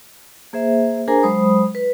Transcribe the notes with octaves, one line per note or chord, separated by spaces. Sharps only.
A#3 G#4 C5 E5
D4 G#4 A#4 C5 G#5 A#5
F#3 G#3 C5 B5 D#6
B4